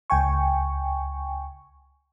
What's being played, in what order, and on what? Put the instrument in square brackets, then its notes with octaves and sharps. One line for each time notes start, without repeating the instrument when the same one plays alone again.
[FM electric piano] C#2 G5 G#5 C#6